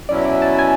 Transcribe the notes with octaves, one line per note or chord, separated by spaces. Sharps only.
B2 F#3 C#4 E4 D5
D5
A5
G#5